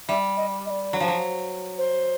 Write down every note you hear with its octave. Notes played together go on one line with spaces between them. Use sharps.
G3 E5
D#5
D#5
D5
F#3
F3
F#3
C5